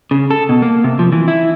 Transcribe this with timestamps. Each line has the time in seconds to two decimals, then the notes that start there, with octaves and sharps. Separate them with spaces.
0.11 C#3
0.31 A4
0.49 B2
0.62 A#3
0.84 C3
0.99 F3
1.12 E3
1.28 E4